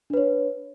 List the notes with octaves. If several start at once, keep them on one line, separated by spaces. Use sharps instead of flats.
D4 B4 C#5